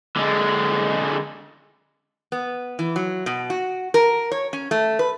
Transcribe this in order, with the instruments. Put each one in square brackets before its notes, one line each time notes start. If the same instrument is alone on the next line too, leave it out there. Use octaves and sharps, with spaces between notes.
[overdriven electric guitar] D3 G#3
[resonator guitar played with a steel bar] B3
E3
F#3
B2
F#4
A#4
C#5
C#4
A3
B4